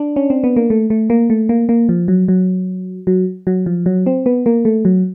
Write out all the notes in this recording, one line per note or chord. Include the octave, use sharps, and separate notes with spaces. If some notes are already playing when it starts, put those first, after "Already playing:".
Already playing: D4
C#4
C4
B3
A#3
A3
A3
A#3
A3
A#3
A#3
F3
F#3
F#3
F#3
F#3
F3
F#3
C4
B3
A#3
A3
F#3